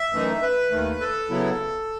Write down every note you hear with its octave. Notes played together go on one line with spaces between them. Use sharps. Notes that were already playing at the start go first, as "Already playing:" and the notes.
Already playing: E5
F#2 E3 A3 D#4
B4
D#2 D#3 A3
A4
C#3 F#3 B3 E4